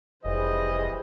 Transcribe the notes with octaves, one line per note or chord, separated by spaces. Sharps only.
F1 E3 G3 G#4 C5 D#5